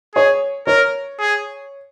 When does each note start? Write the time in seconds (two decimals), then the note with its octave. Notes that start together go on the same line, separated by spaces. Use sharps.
0.15 G#4 C#5
0.67 A#4 C#5
1.19 G#4